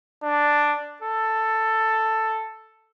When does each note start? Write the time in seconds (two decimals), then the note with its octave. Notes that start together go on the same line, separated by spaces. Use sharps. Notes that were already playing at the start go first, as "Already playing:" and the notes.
0.23 D4
1.02 A4